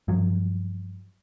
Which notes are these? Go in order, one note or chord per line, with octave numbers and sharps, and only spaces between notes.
G2 F3 F#3